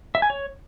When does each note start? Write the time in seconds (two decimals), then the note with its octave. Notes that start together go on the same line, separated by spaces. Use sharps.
0.15 E5
0.22 G#5
0.30 C#5